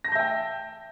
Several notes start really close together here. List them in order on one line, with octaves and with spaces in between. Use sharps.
A#6 A5 G6 E5 G5